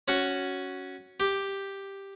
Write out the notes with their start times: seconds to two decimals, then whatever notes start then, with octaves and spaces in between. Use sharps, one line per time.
0.08 C#4 F#4
1.20 G4